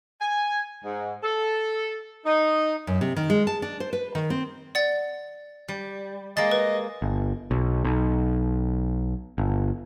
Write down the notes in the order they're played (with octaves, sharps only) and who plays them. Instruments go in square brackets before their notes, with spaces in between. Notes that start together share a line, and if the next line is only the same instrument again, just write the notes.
[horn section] G#5
G#2
A4
D#4
[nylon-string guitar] F#2
C3
D#3
G#3
A5
D4
C5
B4
D#3
C4
[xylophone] D5 F#5 A6
[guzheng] G3
[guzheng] G#3 A#3 [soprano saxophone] D#5 [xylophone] A6
[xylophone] B4
[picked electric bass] G1
B1
B1
G1